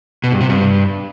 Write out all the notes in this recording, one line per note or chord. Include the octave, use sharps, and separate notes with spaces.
B2
G2
C3
G2